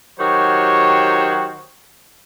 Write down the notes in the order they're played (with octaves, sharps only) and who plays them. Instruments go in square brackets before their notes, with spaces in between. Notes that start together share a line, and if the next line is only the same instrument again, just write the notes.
[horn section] D#3 F#3 F#4 G4 C5 C#5